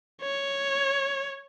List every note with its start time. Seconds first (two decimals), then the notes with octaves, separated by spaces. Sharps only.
0.22 C#5